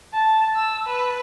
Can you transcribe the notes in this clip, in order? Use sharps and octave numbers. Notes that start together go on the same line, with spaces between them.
A5
E6
B4